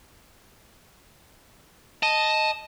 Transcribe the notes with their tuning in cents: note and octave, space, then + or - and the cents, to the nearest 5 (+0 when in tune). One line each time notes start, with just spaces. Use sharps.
D#5 +0 A5 -5